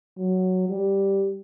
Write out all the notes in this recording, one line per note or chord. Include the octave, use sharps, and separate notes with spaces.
F#3
G3